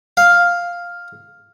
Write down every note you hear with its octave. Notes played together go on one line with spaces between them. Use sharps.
F5